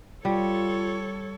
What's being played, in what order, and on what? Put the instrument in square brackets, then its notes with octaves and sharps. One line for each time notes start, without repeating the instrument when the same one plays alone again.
[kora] G3 [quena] F4 [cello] A4 C#5